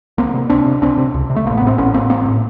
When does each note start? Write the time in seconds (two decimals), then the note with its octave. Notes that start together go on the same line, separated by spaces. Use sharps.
0.18 C#2 A#3 C4
0.34 C3
0.50 C#2 C4 D4
0.66 C3
0.81 C#2 C4 D4
0.98 C3
1.14 C#2
1.30 C3
1.36 A3
1.46 A1 A#3
1.57 A2 B3
1.67 C4
1.78 A1 B3 C#4
1.93 A2 A#3 C4
2.10 A1 A#3 C4
2.26 A2